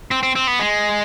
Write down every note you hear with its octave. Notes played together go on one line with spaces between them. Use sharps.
C4
C4
C4
B3
G#3